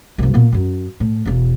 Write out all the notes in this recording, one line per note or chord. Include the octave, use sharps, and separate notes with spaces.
F#1 C2
A#2 B3
F#2 C#4
A2
E1 E2